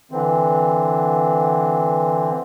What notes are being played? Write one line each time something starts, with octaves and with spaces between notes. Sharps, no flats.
D3 E3 C4